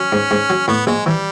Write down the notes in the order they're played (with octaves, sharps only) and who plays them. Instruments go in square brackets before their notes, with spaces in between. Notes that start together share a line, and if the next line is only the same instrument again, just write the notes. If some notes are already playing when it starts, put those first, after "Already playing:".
Already playing: [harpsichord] F#3 [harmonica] C#4
[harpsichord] G#2
G#2
F#3
[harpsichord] A2 [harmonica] B3
[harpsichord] A#1 [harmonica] G#3
[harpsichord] E3 [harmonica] G3